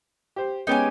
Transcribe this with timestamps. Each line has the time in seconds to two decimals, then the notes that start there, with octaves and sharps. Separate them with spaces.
0.36 G4 C5
0.67 G#3 B3 C#4 D#4 G4 G#5